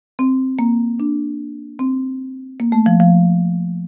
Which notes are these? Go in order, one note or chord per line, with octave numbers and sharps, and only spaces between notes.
C4
A#3
D4
C4
A#3
A3
F3
F3